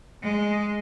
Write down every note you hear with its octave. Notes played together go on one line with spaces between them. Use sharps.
G#3